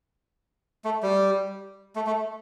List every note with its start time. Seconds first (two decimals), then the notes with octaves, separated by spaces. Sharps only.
0.84 A3
1.03 G3
1.96 A3
2.07 A3